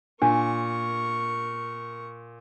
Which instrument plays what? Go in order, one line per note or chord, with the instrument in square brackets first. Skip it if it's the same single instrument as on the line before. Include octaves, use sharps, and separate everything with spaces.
[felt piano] A#2 [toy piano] D4 [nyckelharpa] A#4 C#6